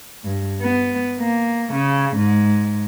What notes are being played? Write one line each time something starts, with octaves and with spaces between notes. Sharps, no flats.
G2
B3
A#3
C#3
G#2